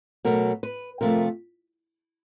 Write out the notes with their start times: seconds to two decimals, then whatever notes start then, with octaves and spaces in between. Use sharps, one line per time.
0.25 B2 F#3 A3 A#4
0.63 B4
1.01 C3 F3 A3 A#4